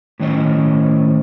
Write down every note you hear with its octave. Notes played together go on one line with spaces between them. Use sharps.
A2 D#3 C#4 C5 D#5